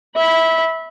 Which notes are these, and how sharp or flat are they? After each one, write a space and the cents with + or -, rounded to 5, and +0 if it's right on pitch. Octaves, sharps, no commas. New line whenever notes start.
E5 -20 B5 +0